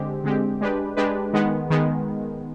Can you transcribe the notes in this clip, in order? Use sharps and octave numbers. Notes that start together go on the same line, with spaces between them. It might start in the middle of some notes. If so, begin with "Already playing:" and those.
Already playing: D3 G#3 C4 G4
D3 G#3 C4 G4
G#3 D4 G4 B4
G#3 D4 G4 B4
D#3 G#3 B3
D#3 G#3 B3